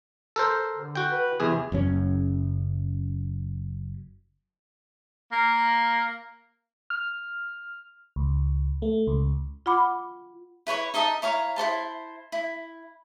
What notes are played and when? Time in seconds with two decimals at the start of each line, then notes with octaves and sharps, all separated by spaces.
0.36 A4 A#4 C5
0.75 D3
0.95 F#4 G5
1.11 B4
1.40 E2 C3 G#4
1.72 F#1 F#2 C#4
5.32 A#3
6.90 F6
8.16 C#2
8.82 A3
9.07 C#2
9.66 F4 F#5 B5 D6
10.67 E4 B4 C#5 C#6
10.94 D#4 D#5 E5 A5
11.22 E4 C#5 F5 A#5
11.56 E4 A4 C5 A5
12.32 E4